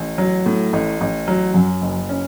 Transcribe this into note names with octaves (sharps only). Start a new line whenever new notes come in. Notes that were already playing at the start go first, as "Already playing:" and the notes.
Already playing: A1
F#3
A2
A1
A1
F#3
F#2
F#1
C#4